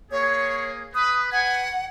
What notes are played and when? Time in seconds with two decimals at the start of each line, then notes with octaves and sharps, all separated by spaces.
0.11 A#3 G#4 C#5
0.95 B4 D#6
1.32 B4 F#5 G#5